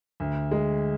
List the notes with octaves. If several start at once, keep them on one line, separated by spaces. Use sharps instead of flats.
D2
G#3